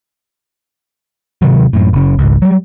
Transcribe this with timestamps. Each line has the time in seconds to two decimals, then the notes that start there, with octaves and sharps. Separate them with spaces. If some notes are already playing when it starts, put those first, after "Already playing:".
1.42 C3 D#3 F#3
1.73 F#2 A2
1.93 F#1 C#3
2.19 G#1 C#2
2.42 F#3 G3